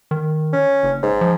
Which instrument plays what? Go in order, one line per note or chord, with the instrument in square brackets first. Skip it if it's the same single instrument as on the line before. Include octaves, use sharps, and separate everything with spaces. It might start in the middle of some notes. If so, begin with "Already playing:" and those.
[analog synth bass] D#3
[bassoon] C#4
[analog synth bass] F#1
[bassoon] G#2
[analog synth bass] F3